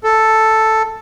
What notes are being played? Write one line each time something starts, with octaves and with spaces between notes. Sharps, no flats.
A4